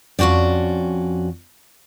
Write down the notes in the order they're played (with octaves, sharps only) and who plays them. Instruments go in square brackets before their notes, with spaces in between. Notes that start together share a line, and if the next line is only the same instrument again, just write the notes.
[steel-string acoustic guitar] F2 C#4 F#4 G4 D5